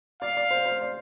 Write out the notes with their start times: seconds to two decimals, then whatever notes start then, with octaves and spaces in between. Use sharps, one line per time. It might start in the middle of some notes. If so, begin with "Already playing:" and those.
0.22 D5 F5
0.37 D5
0.51 C5
0.66 C5
0.81 D5